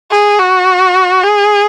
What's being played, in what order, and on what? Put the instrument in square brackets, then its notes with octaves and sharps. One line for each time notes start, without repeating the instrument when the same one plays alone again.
[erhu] G#4
F#4
G#4